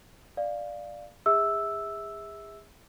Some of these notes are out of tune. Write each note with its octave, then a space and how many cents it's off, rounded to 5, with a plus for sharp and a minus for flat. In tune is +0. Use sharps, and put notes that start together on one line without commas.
D5 +10 F5 +0
G#4 -30 E5 -20 E6 +0